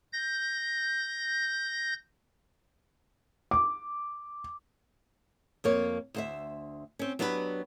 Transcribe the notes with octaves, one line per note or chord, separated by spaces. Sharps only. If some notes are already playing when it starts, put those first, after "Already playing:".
G6 A#6
D6
F2 A#3 C#5
D2 C5 E5
C4 C#4
F#3 B3 D4 G4 A#4 B4